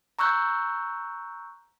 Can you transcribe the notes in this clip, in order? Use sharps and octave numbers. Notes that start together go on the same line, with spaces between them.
A#5 C#6 E6 F#6 G6